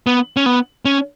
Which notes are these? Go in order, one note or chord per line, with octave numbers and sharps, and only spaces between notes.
B3
C#4
B3
C#4